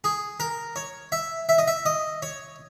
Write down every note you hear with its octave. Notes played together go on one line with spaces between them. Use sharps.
G#4
A#4
C#5
E5
E5
D#5
E5
D#5
C#5